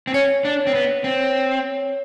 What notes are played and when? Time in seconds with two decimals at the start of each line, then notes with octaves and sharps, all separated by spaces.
0.07 C4
0.14 C#4 C#5
0.45 D4
0.67 C4
0.74 B3
1.04 C4